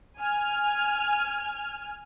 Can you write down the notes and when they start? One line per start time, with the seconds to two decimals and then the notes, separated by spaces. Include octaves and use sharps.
0.19 G#5 F6